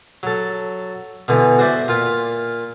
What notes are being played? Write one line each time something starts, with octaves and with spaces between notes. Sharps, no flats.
F#3 A4
B2 D3 E3
F#4 C5 D5 E5 G5
A#2 F4